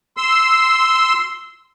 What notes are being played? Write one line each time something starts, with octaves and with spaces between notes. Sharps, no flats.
C6 E6